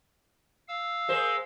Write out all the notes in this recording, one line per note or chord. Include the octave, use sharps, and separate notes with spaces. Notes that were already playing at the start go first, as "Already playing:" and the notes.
F5 E6
G#3 A#4 C5